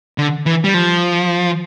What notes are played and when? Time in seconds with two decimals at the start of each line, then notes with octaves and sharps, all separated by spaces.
0.18 D3
0.46 E3
0.64 G3
0.74 F3